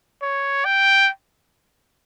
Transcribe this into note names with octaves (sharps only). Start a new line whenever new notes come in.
C#5
G5